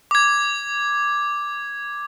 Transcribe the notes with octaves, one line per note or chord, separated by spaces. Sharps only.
D6 G#6